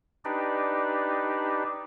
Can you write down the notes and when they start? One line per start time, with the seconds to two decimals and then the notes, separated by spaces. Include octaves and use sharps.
0.25 D4 D#4 G4 B4 D5